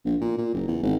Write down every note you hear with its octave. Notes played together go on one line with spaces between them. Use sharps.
A#1
A#2
A#2
F#1
E2
G#1